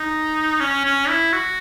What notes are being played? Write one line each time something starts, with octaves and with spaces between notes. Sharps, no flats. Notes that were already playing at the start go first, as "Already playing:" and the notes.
Already playing: D#4
C#4
C#4
E4
F#4